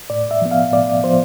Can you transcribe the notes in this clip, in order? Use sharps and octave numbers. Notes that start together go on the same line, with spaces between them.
A2 D5
E5
F3 B3
F5
A2 D5
F3 B3 C5